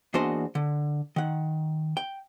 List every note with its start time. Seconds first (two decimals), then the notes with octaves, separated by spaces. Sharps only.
0.14 E2 A#3 D4 F#4 C5 D#5
0.55 D3
1.16 D#3 F#5
1.97 G5